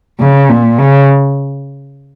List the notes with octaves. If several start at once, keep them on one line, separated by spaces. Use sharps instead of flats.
C#3
A#2
C#3